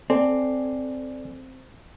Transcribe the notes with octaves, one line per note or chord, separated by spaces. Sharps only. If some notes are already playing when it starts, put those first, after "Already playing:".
C4 A4 D5 G#5